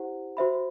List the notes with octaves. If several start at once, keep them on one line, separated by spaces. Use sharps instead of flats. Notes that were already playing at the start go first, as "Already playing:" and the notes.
Already playing: E4 G4 C5 F#5
F#4 C5 E5 B5